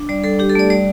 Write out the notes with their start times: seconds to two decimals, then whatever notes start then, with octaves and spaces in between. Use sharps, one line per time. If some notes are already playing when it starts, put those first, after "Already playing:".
Already playing: D4
0.09 G3 D5
0.24 G3 A4
0.39 D4 G4
0.49 A4
0.55 A3 D5
0.70 G3 D5